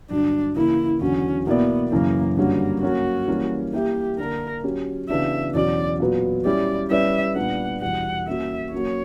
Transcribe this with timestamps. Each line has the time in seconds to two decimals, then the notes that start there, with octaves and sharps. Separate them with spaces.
0.10 G2 D3 F#3 D4
0.55 C#3 E3 A#3 E4
1.01 E2 D3 F#3 C#4
1.46 B2 A#3 B3 E4 A#4 D5
1.91 F#2 C#3 E3 A#3
2.37 G2 D3 G3 A#3 C#4 F#4
2.82 F#3 A#3 C#4 F#4
3.28 E3 G3 A#3 C#4
3.73 A#3 E4 G4 A#4 E5
4.18 D3 A#3 D4 A#4
4.64 F#3 C#4 G4
5.09 C#3 E3 B3 D4 F#4 E5
5.55 E2 B2 F#3 C#4 D5
6.00 A#2 F#3 B3
6.45 G3 C#4 E4 G4 D5
6.90 G3 C#4 E4 B4 D5 E5
7.36 A#2 G3 B3 D4 F#5
7.81 E2 B2 G3 F#5
8.27 A#3 C#4 F#4 E5
8.72 F#3 A#3 C#4 F#4 C#5